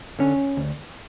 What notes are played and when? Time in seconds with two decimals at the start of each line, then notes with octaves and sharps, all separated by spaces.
0.19 D3 C#4
0.57 D2